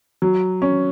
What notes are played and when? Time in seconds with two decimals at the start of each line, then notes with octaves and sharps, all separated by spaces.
0.22 F#3
0.62 C#4